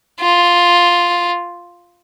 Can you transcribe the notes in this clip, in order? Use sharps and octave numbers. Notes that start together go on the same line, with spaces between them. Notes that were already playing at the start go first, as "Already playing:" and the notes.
F4